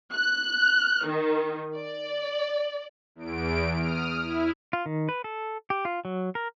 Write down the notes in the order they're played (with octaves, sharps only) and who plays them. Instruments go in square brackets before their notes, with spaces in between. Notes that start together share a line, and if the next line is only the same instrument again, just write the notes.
[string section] F#6
D#3
D5
[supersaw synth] E2 D7
D#6 F6
E4
[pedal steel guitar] F4
D#3
B4
A4
G4
F4
F#3
A#4